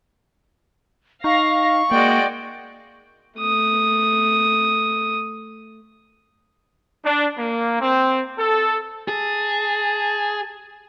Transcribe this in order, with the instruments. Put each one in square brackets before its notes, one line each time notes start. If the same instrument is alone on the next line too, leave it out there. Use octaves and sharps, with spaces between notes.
[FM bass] D#4 [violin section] F5 A#6 [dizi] C#6
[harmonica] G#3 F#4 G5 [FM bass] A#3 [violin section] D5
[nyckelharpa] A3 D#6
[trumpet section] D4
A#3
C4
A4
[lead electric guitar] G#4 [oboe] A5